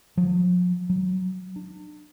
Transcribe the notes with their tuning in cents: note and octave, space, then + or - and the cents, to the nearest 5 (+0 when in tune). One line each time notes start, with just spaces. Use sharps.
F3 +45
F#3 +0
D4 +35